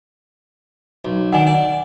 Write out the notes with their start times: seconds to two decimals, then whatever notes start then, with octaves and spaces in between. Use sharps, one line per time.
1.05 B1
1.32 D#3 D4 F#5 G#5
1.47 D5